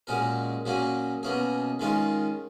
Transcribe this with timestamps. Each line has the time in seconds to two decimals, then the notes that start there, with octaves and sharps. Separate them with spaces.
0.07 A#2 G#3 C#4 F#4 A#4
0.66 A#2 F#3 A#3 C#4 G#4
1.23 B2 A#3 C#4 G#4
1.80 D#3 G#3 C#4 F4 A#4